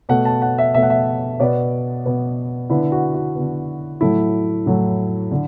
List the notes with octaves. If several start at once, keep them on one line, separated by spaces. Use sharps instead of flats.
B2 A3 F#5
A5
F#5
E5
B2 A3 E5
F#5
E5
B2 B3 D5
B2 B3
D3 B3 E4
F#4
F#4
D3 B3
A2 F#3 A3 E4
A2 F#3 A3
D3